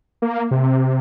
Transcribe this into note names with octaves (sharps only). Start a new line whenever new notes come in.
A#3
C3